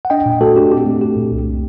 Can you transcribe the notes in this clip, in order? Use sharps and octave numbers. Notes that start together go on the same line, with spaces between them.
F#5
D4 D#5 G5
A#2
A3 F#4 A4
D4 G4
C4 G4
A3
A3 G4
A#2
C2